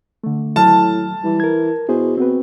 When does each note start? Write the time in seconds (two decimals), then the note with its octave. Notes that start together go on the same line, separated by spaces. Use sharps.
0.24 D3 A3
0.56 D#2 A2 F#3 A5 F6
1.24 E3 G3
1.40 A#4 G#6
1.89 B2 E4 G#4 C5
2.17 C4 F#4 B4